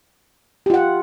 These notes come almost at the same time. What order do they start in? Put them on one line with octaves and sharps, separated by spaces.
G4 F4 F#5